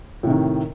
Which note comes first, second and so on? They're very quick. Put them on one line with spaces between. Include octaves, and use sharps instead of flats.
A2 C3 D#3